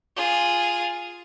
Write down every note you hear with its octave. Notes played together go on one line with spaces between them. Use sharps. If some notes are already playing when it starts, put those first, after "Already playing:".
F4 G#4